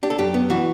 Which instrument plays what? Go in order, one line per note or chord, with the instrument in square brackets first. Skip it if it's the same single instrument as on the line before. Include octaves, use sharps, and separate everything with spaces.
[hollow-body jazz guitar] D4 G4
A4
F#2 G4
B3
E3 F#4